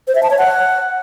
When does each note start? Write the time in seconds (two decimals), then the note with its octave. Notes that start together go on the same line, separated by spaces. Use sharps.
0.08 C5
0.15 E5
0.23 A5
0.31 C#5
0.38 F#5